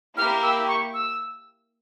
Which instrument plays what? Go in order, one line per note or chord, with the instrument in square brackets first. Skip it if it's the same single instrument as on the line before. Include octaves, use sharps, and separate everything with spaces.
[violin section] A#3 E4 G4 A#4 [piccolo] F6
[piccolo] E6
C#6
E6